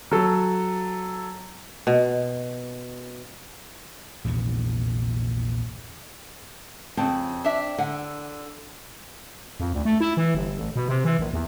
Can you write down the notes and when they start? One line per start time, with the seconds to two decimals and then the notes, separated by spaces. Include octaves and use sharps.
0.11 F#3 A4
1.87 B2
4.24 A#1 E2 G2 C3
6.97 F2 C#3 C4 A5
7.44 D4 E5
7.78 D3 F#5
9.60 F2
9.74 D2
9.85 A3
10.00 E4
10.17 E3
10.35 G1
10.58 A1
10.76 B2
10.89 C3
11.05 E3
11.19 A#1
11.33 E2